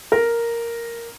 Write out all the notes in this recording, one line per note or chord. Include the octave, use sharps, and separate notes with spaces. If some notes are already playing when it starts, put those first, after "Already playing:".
A#4